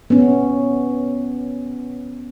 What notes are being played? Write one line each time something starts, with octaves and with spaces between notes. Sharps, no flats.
B3 C#4